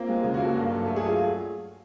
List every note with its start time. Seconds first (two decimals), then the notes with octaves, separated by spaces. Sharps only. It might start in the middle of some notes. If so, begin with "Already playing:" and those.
Already playing: A#3 C4 F4
0.09 G#3
0.24 C#3 F4
0.34 F#4
0.39 A#3
0.45 A4
0.55 G2
0.71 F#3
0.85 A3 A4
0.96 G#4
1.01 F#3
1.06 F4